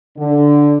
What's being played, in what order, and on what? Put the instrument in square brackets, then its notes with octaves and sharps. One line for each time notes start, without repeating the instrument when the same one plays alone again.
[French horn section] D3